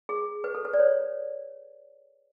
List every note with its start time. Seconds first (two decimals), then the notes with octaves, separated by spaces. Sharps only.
0.09 G#4
0.44 B4
0.55 A4
0.65 B4
0.73 D5
0.79 C#5